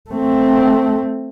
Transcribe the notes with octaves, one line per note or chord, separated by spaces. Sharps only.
A3 C4